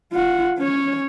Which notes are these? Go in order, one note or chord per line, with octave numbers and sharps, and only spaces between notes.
F4 F#5
C#4 C#5